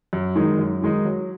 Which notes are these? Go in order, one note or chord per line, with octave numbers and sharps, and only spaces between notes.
F#2
D#3 G#3 D#4
F#2
D#3 G#3 D#4
F#3